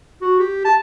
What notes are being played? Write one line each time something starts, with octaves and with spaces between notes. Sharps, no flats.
F#4
G4
A5